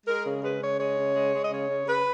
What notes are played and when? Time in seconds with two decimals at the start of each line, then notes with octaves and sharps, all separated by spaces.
0.07 G#3 A#4
0.25 C#3
0.43 G#3 B4
0.61 C#3 C#5
0.78 G#3 C#5
0.97 C#3
1.15 G#3
1.33 G#3
1.42 D#5
1.50 C#3 C#5
1.69 C#3
1.86 C#3 B4